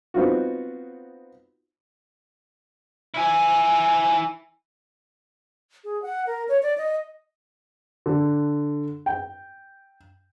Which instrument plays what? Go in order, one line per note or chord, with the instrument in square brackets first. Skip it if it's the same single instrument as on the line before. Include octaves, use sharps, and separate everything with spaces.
[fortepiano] B3 C4 D#4 F4 F#4
[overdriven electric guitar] E4 G#5
[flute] G#4
F#5
A#4
C#5
D5
D#5
[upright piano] D3
G5